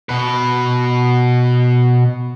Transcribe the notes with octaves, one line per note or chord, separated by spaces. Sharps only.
B2 B4